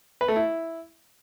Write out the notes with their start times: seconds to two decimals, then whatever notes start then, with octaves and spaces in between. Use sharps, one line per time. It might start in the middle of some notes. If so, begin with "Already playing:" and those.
0.21 B4
0.28 A3
0.36 E4